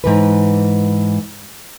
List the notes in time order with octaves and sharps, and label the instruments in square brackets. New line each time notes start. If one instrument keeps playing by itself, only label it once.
[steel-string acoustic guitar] G#2 E3 B4